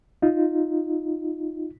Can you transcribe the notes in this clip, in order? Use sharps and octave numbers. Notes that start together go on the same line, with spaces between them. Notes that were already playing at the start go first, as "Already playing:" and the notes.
D#4 F4